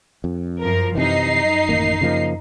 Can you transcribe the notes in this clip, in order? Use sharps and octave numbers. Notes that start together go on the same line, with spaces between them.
F2
F#2 F3 A#4
F#2 C3 E3 D#4 C7
A1 D#3 A#3
C#3 F3 A#3